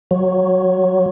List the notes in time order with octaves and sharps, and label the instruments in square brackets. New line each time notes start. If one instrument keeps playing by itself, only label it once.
[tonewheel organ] F#3